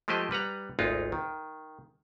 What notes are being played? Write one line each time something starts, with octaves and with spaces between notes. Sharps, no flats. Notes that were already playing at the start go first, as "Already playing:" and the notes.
F3 G#3 A3 G4 C5 D#5
G3 B4 F#5 A#5
G#1 D2 G#3 D#4 F4
D#3